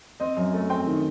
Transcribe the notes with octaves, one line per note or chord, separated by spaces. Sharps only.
C4 D#5
F#2
A3
C4 G5
D#3